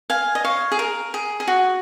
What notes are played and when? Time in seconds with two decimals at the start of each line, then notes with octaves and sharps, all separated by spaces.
0.10 F5 G#5
0.35 D#5
0.45 C#5 F5
0.72 G#4
0.79 A#4
1.14 G#4
1.40 G#4
1.47 F#4